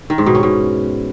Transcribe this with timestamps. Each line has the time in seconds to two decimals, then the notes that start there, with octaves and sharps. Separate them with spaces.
0.10 D#3
0.18 G#2
0.26 B2
0.35 C#4
0.43 B2